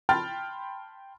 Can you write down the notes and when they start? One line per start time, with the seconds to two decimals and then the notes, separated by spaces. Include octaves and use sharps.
0.09 G5 A5 B5 C6 F6 A6